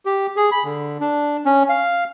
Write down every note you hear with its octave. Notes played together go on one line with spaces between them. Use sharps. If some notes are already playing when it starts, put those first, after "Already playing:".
G4
G#4
B5
D3
D4
C#4
F5